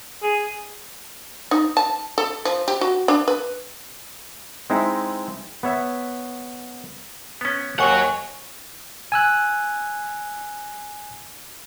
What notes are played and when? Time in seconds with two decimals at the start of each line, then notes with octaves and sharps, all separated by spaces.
0.23 G#4
1.51 D#4
1.77 A5
2.18 A4
2.45 F3
2.68 G4
2.81 F#4
3.08 D4
3.28 B4
4.70 G#3 C4 D#4 E4
5.63 B3 C#5 E5
7.41 B3 C#4
7.79 D#2 C#5 F#5 G#5 C#6
9.12 G#5 E6 F#6